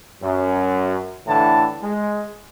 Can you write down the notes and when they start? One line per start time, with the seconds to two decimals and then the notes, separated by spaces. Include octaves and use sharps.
0.22 F#2
1.27 A2 D3 E3 E4 A5
1.82 G#3